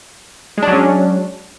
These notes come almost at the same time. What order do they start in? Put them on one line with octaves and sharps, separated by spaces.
G#3 D4 F#3 C#4